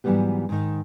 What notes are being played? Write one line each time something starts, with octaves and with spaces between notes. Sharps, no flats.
G#2 E3 F#3 G3 B3 G4
G#2 D#3